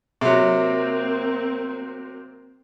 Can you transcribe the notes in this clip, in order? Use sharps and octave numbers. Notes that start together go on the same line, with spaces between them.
C3 F#3 A#3 C4